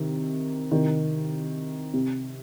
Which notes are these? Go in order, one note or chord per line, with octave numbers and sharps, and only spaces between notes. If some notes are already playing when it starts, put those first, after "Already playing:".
Already playing: C3 D#3
C3 D#3
C3